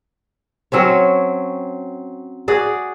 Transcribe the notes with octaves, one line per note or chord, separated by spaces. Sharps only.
F#3 C4 C#4 C#5
F#4 G#4 D5